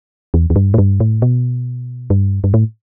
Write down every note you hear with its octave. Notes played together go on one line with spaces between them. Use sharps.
E2
E2
G2
A2
G2
A2
B2
G2
G2
A2